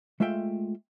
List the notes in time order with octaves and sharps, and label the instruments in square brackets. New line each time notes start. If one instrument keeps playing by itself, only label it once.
[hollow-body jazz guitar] G#3 A3 F4 E5 G5